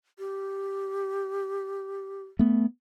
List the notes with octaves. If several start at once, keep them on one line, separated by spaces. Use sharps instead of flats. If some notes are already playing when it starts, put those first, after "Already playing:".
G4
A3 B3